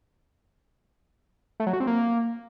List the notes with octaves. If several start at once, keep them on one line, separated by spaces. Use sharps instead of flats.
A3
F#3
F#4
C4
A#3